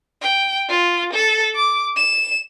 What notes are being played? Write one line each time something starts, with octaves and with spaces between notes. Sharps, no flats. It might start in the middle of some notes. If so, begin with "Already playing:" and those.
G5
F4
A4
D6
E7